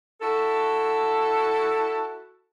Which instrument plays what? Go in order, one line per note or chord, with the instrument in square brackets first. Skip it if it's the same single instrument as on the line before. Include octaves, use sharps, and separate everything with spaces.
[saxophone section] E4 F#4 A4